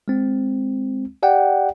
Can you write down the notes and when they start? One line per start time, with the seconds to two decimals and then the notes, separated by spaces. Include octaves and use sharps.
0.08 G#3 C4
1.23 G4 D5 F#5 G5